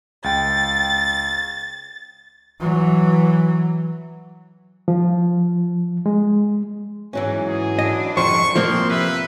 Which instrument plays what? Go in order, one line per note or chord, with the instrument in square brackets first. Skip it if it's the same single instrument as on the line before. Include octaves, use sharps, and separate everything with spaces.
[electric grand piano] C#2 G5 [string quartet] A6
[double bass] E3 F#3
[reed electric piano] F3
G#3
[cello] G#2 [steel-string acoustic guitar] E3 F#3 C#4
[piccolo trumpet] G#4
[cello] D4 E4 [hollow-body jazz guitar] D#5
[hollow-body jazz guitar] F2 C5 [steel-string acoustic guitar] G#2 D3 G3 [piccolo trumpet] C#6
[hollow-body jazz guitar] F3 A#3 C4 [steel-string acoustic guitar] D4 [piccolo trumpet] C6
[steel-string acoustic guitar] C3 [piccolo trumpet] B4 [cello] E5